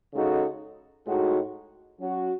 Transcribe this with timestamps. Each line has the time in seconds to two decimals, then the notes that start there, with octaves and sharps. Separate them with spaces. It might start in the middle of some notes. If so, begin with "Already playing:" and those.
0.13 C#3 G#3 D#4 F#4 A4
1.06 A2 G#3 D#4 F#4
1.99 F#3 C#4 F#4